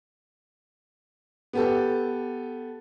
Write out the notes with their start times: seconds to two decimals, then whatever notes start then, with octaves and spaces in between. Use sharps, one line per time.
1.53 B3 G4 A4